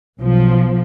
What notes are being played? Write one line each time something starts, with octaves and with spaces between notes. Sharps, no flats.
B1 F3